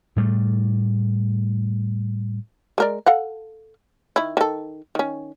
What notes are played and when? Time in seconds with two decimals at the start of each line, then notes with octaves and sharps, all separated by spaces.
0.16 A2 G3 A3
2.78 G#3 A#4 D5
3.06 A4 F5 F#5
4.16 D#3 E4
4.37 D#3 A4
4.95 D#3 C#4